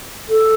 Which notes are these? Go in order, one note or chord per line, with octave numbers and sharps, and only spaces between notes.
A4